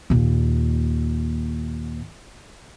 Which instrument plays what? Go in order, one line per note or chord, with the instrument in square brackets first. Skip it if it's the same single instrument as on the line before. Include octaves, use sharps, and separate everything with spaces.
[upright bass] D#2 A#2